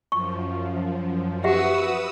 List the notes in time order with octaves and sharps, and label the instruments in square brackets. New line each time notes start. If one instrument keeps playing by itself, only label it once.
[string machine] F#2 F3 [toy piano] C#6
[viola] F#4 [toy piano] G4 E5 F#5 [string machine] B4 D#6 E6